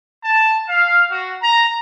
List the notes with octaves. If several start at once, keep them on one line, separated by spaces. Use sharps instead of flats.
A5
F5
F#4
A#5